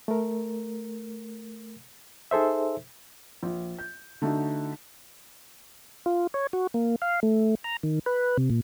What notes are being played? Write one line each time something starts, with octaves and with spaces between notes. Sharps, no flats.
A3 A#4
D#4 G#4 A4 C5 E5
A#1
G6
D3 A3 D4 D#4 F#4
F4
C#5
F#4
A#3
F5
A3
A#5
D#3
B4
C3
A#2